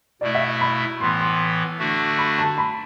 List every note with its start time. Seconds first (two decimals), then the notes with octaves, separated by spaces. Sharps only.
0.21 B2 A3 E4 D5
0.35 E5
0.61 B5
1.00 A2 E3 B3 C6
1.20 C6
1.79 D3 A3 D4 F#4
2.18 B5
2.39 A5
2.58 B5